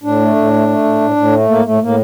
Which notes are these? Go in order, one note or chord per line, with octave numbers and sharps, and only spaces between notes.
A2 D4
A3
A2
A3
A3
A2
A2
A2
A3
A2 A#3
A2 A3
A2 A#3